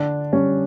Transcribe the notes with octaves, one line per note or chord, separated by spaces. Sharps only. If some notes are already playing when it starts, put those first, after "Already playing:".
Already playing: D3 D4
G3 C#4